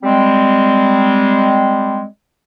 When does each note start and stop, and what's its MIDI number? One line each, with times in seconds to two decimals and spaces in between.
0.03 2.05 55
0.03 2.05 56
0.03 2.05 60